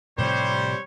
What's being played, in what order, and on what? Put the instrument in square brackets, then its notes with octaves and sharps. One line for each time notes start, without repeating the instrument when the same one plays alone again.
[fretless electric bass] A2 C3 F3 [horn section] G3 C5 [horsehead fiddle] C#5